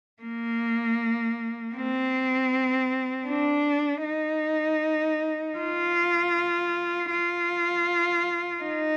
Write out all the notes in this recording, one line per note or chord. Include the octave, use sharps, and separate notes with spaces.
A#3
C4
D4
D#4
F4
F4
D#4